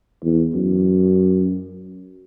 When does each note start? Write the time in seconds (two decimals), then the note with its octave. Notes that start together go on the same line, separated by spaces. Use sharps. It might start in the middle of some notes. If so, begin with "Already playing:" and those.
0.23 E2
0.54 F#2